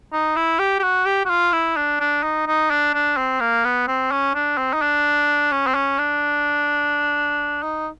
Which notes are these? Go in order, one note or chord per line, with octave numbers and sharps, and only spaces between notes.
D#4
E4
G4
G4
F#4
G4
F#4
F4
E4
D4
D4
D#4
D#4
D4
D4
C4
A#3
B3
C4
C#4
D4
C4
D#4
D4
C#4
C4
C#4
D4
D#4